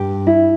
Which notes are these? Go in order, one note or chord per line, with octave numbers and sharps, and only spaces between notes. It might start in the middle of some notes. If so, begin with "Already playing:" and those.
Already playing: G2 G4
E4